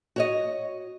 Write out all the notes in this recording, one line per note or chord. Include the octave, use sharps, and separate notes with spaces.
F#4 C#5 D#5